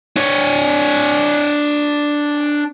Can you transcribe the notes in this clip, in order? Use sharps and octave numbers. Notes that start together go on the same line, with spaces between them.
D4 C#5